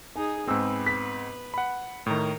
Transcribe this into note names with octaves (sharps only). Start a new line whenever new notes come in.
D#4 G#4 G#5
G#2 B3 C4 B4 G#5 E6
B6
F#5 B5
A2 D#3 A#4 A#5